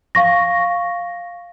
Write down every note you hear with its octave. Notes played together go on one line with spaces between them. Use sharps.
F5 C#6 A#6